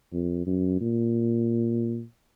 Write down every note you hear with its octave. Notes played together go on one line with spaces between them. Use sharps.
F2
F#2
A#2